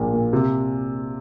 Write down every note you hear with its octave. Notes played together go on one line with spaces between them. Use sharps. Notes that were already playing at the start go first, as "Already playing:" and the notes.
Already playing: A#1 A#2 A#3
A#2
C3